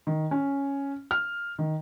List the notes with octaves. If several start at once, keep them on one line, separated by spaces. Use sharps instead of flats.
D#3
C#4
F6
D#3